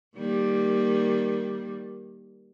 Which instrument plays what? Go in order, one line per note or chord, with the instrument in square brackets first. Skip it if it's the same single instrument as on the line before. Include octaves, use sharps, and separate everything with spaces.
[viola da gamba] D#3 G3 A#3